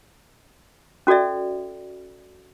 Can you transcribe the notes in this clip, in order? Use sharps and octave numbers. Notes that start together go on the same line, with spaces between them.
C#4 F#4 A4 D5 E5